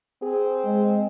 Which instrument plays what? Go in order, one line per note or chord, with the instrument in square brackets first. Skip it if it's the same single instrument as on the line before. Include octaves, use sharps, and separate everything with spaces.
[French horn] C4 [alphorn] G#4
[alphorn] G#3